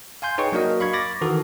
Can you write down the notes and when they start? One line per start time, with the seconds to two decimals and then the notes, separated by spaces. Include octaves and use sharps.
0.22 F5 G#5 C6 G6
0.38 D#4 G#4 B4 C#5 G5 C#6
0.52 F#3 A#3 D4 F#4 A#4 D#5
0.80 F5 B5 C#6 G#6
0.93 B5 D6 A6 A#6
1.21 D#3 E3 F#4 A4